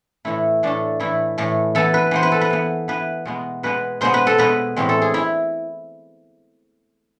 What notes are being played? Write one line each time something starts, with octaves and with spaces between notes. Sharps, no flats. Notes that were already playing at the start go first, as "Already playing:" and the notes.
A2 E3 A3 E4
A2 E3 A3 D4
A2 E3 A3 E4
A2 E3 A3
E3 B3 A4
B4
E3 B3 C5
B4
A4
B4
E3 B3
E3 B3 B4
B2 G#3 B3
B2 G#3 B3 B4
B2 G#3 B3 C5
B4
A4
B2 G#3 B3 B4
A2 E3 G#3 C4
A4
G#4
E4